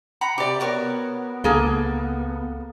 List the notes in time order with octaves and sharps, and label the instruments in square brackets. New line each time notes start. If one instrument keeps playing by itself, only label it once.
[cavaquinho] F#5 A#5 B5
[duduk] C3 [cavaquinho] G4 D5
[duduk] B3 [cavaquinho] F#4 A#4 C#5
[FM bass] C#2 [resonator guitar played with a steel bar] A#3 G#4 A4